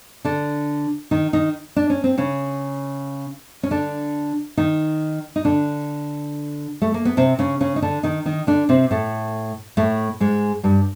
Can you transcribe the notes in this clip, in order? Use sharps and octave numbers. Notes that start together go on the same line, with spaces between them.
D3 D4
D#3 D#4
D#3 D#4
D4
C#4
C4
C#3 C#4
C#4
D3 D4
D#3 D#4
D#4
D3 D4
A3
A#3
B3
C3 C4
C#3 C#4
C#3 C#4
D#4
D3 D4
D#3 D#4
D#3 D#4
D3 D4
C3 C4
A2 A3
A2 A3
G#2 G#3
G2 G3